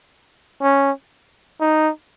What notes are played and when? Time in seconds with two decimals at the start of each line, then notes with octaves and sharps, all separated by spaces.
0.62 C#4
1.61 D#4